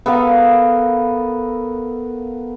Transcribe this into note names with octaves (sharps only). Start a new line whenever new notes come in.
B3 A4 A#4 F5